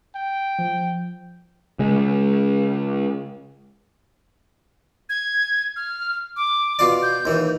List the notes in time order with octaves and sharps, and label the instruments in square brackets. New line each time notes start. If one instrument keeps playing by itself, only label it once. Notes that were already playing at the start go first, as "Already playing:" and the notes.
[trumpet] G5
[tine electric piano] F3
[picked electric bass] C#3 G#3
[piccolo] G#6
F6
D6
[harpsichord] B2 F4 D5
[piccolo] G6
[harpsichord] D#2 E3